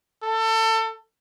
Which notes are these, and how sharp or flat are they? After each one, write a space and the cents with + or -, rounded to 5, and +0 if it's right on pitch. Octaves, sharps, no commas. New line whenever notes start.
A4 +25